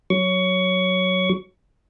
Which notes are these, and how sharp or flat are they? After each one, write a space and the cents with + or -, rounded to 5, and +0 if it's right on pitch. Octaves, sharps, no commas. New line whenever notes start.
F#3 +0 C#6 +20